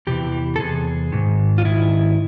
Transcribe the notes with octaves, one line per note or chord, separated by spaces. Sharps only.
E2 C3 E3 G4
A4
E2 C3 G#4
G#2 D#3
F4
G#2 D#3 E4